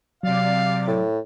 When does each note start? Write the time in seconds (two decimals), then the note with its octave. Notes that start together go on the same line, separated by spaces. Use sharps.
0.23 C3 F#3 D5 F5 A6
0.88 A2